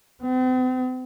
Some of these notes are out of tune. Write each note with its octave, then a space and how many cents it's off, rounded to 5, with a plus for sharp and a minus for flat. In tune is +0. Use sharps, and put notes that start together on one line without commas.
C4 -45